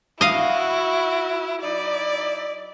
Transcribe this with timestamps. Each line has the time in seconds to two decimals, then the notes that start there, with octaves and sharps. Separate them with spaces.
0.21 E4 F#4 D#5 F5
1.61 F#3 D#4 E4 D5